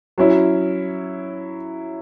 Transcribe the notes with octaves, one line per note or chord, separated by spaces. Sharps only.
F#3 C#4 E4